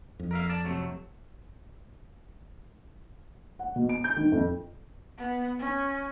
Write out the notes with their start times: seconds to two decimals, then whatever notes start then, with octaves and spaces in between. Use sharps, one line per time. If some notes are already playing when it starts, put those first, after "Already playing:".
0.19 F2
0.31 A#4 E5 F5
0.49 D5 A5
0.65 C3 F#3 A3
3.59 F#5
3.76 B2
3.89 D7
4.04 G6
4.16 D#3
4.32 F2
5.18 B3
5.59 C#4